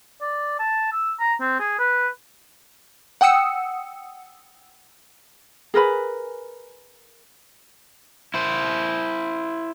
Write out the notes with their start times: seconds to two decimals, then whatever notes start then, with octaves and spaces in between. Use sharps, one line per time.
0.21 D5
0.59 A5
0.92 E6
1.20 A#5
1.40 C4
1.59 G#4
1.79 B4
3.21 F#5 G5 D#6 E6 C#7
5.74 G#4 A#4 B4 B5
8.34 E4 C5